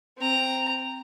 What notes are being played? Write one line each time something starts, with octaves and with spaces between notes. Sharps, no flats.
C4 A#5